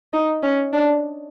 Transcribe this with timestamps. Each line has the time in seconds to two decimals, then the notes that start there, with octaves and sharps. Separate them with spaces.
0.13 D#4
0.43 C#4
0.72 D4